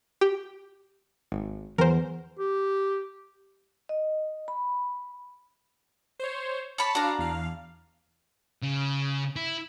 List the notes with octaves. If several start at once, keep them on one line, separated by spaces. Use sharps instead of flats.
G4
G#1
E2 A#4 C5
G4
D#5
B5
C5 C#5
C#5 A5 B5
D4 F#4 F5 A#5
E2 F5
C#3
E4